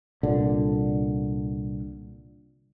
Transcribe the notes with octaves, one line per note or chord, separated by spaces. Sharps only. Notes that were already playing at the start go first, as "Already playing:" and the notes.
C2 A#2 D3